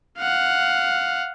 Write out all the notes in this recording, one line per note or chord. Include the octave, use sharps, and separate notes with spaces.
F5 F#5